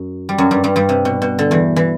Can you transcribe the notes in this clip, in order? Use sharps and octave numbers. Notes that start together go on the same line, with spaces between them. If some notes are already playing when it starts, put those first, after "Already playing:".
Already playing: F#2
G3
F#2 F#3
G2 G3
G2 G3
G2 G3
C3
B2
B2
D3
E2 E3
E3